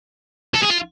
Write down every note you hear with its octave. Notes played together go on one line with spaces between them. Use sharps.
A4
G#4
F4